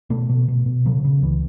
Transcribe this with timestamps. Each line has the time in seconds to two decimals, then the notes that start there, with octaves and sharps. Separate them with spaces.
0.10 B2 A3
0.29 B2
0.48 B2
0.66 B2
0.86 C#3 F#3
1.04 C#3
1.22 C#2 E3